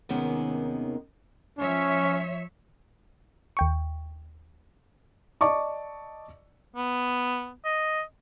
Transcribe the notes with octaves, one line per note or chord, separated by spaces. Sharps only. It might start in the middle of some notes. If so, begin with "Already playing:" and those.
D#2 C3 D#3 G#3 B3 C#4
F3 C#4 C#5 E5
D#2 G5 C#6
D5 D#5 A5 C#6 D6
B3
D#5